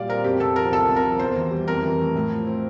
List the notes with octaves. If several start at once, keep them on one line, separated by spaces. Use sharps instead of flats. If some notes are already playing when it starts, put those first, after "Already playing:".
Already playing: A#2 G3 D5 F5
C4 A#4
F2 G4
C3 A4
F3 A#4
C2 A4
C3
A#4
F3
E2 C5
E3
G3
F2 A#4
E3
A3
A2
F3
C4